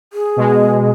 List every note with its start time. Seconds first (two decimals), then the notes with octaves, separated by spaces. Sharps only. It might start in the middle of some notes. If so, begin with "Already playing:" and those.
0.13 G#4
0.36 B2 G#3